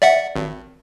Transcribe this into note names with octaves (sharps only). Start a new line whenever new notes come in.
D5 E5 F#5
G#1